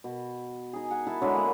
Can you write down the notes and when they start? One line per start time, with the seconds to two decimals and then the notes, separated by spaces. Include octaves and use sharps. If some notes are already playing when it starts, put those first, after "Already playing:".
0.04 B2
0.73 D#4 G#4
0.91 F#5 G#5
1.07 E4 E5 A5 B5
1.22 D3 F#3 G#3 E4
1.34 A#3 B3 D#5 F#5